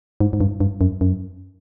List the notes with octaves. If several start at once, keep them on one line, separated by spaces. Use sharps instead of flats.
G#2
G#2
G2
G2
F#2
F#2